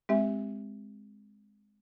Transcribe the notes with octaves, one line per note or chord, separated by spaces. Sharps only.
G#3 C4 G4 E5